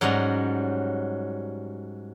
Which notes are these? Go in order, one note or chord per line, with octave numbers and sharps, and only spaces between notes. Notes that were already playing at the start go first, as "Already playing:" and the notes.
G#2 F#3 G3 C#4 D#5 A#5